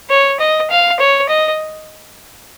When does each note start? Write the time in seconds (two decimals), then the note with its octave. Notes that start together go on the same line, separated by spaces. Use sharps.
0.10 C#5
0.39 D#5
0.70 F5
0.99 C#5
1.29 D#5